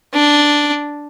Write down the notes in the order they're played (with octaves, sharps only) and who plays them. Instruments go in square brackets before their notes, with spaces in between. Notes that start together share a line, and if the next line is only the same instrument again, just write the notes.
[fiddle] D4